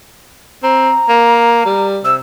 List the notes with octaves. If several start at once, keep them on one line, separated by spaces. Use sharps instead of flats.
C4 A#5
A#3
G3
C3 E6